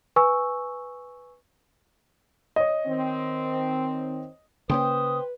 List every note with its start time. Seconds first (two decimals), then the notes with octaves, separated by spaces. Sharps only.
0.16 B4 G#5 C#6 E6
2.56 C#5 D#5
2.87 D#3 C4
4.70 C#3 A#3 C#4 B4 C5 G5 D#6